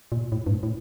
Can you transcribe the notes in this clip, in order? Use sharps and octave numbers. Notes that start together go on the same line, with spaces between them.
A#2
A2
G2
A2
A2